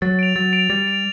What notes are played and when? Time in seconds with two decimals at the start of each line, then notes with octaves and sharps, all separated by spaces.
0.02 F#3 A6
0.19 D7 F7
0.36 F#3 A6
0.53 D7 F7
0.70 G3 A6
0.87 D7 F7